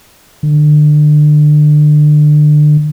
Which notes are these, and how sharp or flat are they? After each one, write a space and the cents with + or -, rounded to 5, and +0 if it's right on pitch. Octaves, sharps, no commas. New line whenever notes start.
D3 +30